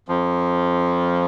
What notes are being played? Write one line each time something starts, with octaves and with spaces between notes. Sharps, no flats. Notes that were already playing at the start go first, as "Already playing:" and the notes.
F2 F3